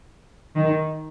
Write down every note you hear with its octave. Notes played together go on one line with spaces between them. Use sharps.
D#3